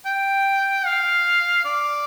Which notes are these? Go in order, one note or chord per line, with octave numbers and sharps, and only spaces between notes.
G5
F5
D5